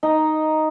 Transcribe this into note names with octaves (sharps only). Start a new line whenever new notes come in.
D#4